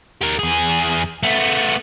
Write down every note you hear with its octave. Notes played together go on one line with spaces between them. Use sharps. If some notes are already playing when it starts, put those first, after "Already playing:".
G4 A#4
E2 G#4
A3 B3